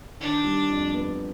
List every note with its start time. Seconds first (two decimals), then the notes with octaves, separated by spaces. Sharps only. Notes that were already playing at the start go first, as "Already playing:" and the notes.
0.20 D#3 D4
0.44 G3
0.70 F2
0.94 B3